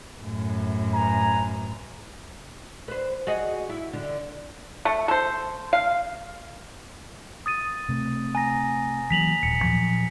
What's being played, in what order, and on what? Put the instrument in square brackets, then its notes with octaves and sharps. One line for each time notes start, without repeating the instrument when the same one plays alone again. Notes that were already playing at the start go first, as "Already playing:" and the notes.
[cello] F#2 A2
[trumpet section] B4 G#5 A#5
[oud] B4 C5
F#4 G#4 D#5
E4
D3
[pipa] A3
A4 C5
F5
[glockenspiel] D#6 A6 D#7
[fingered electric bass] C3 A3
[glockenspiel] G#5 A#5 A#6
[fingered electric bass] E3 F#3 A#3 [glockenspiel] B6 F7 F#7
[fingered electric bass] D#1 [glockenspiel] B6 C#7
[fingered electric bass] A#2 F3 F#3